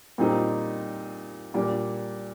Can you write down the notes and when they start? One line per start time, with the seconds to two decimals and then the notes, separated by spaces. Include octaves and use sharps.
0.18 A#2 G3 C4 D#4
1.54 A#2 G3 D4